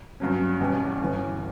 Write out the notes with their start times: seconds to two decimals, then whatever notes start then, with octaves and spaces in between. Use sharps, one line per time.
0.20 G2 F#3 C#4
0.60 E2 B2 G3 C#4
1.00 G1 G2 E3